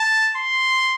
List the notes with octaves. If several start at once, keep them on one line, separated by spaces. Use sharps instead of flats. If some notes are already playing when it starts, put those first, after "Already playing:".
Already playing: A5
C6